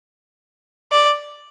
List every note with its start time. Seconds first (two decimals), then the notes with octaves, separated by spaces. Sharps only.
0.92 D5